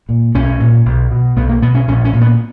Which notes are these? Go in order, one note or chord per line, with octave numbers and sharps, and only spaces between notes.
A#2
B1 C#4
A#2
B1
B2
B1 B3
A#3
B2 B3
C#4
A#1 C#4
C#4
A#2
B3